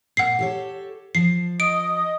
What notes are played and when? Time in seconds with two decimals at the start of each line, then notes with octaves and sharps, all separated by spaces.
0.17 A#2 F#5 C7
0.39 G4 A4 C#5
1.15 F3 C7
1.60 D#5 D#6 D7